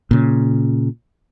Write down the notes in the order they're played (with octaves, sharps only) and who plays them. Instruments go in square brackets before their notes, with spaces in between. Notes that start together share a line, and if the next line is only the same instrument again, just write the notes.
[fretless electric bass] A#2 C#3